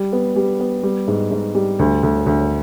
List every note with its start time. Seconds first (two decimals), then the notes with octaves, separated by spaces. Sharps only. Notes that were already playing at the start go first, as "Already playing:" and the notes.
Already playing: G3
0.12 B3
0.36 G3
0.60 B3
0.83 G3
1.08 G#2
1.31 G#2
1.55 G3
1.79 D2
2.03 D2
2.26 D2